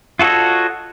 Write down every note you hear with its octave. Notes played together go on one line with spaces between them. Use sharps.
F4 F#4 A4 C#5 D#5